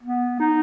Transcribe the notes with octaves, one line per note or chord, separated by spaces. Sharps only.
B3
D#4